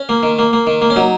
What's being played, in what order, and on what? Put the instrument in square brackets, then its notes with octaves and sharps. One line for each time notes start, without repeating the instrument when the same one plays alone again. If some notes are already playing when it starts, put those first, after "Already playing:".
Already playing: [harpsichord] C#4
A#3
D#3
A#3
A#3
D#3
A#3
C#4
F#3 D#4